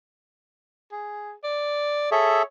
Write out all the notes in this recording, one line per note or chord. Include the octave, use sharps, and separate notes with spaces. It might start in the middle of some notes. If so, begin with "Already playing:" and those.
G#4
D5
G#4 A4 C#5 E5